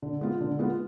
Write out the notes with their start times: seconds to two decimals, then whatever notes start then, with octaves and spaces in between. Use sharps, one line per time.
0.02 D3
0.21 G#3 B3 F4
0.40 D3
0.59 G#3 B3 F4